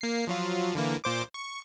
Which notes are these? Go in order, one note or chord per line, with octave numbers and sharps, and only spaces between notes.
A#3 C7
F3 F#3 F4
D3 E3 A#3
A#2 C5 D6
C#6